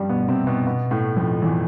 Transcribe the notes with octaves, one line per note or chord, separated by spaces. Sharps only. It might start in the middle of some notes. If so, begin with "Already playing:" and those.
Already playing: G2 F3 G3
B2 B3
C3 C4
B2 B3
B2 B3
A2 A3
F2 F3
E2 E3